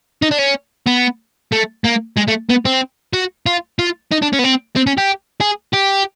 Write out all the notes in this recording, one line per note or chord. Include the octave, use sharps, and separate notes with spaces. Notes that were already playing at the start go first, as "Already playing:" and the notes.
D#4
D4
C#4
B3
A3
A#3
G#3
A3
B3
C4
F#4
F4
F4
D#4
D4
C#4
B3
C4
C4
C#4
G4
G#4
G4